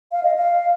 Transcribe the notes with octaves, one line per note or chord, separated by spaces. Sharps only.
F5
D#5
F5